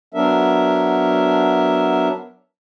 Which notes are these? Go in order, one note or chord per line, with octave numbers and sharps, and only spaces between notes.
F#3 B3 D4 A#4 E5